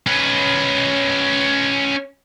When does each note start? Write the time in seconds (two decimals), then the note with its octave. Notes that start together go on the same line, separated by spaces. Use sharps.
0.07 C#4 B4